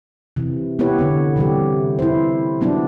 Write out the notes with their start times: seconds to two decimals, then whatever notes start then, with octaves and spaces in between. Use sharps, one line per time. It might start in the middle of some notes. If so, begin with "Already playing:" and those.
0.36 C3 E3
0.79 B3 E4 G4 B4 C#5
0.98 D3 B3
1.36 C3 E3 G3 G4
1.99 E4 C5
2.61 F#3 B3 D4 E4